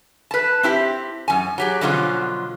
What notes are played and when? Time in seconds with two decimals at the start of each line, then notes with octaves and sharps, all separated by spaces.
0.31 B4 A5
0.63 C4 E4 G4
1.28 F#2 G#5
1.58 F#3 G4 G#4
1.81 B2 D3 F3 F#3 C#4 F4